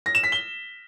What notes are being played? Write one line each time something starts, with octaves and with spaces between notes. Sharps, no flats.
A#6
E7
B6
G7